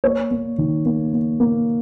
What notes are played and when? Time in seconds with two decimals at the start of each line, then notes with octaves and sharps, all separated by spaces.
0.04 A#3 C#5
0.31 A#3
0.58 D#3
0.86 A#3
1.13 A#3
1.40 A#3